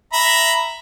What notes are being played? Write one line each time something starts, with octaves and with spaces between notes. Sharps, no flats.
E5 A#5 B5